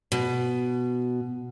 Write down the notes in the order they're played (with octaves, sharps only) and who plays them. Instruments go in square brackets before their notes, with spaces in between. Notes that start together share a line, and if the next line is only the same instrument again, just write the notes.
[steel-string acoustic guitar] B2